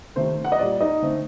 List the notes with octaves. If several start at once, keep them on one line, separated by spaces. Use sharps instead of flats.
C3 D#3 A3 C5
F#5
D#5
A#2 G3 A#3 D5
D#4 D#5
D3 A3 C4